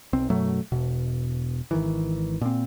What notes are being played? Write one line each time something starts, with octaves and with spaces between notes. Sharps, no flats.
B1 C4
F#2 B2 F#3 A3
E1 B2
G#1 D#3 E3
A#2 C4